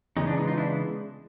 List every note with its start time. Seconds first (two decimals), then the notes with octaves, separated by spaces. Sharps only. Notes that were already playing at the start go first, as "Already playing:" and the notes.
0.17 C#3 E3 G#3 B3 D#4
0.27 D4
0.37 D#4
0.47 D#4 F4
0.57 D4 E4